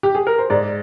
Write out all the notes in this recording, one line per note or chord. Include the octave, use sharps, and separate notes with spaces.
G4
G#4
A#4
C5
G#2 D5